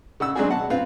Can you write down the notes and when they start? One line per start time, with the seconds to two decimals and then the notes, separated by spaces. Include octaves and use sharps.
0.20 C#3 F#5 E6
0.35 F#3 G#3 C4 D4 F#4 G#4
0.49 B2 F#5 A5
0.70 C4 F4 B4 F5